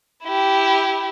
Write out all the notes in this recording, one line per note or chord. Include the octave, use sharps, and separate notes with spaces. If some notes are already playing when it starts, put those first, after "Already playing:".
E4 G4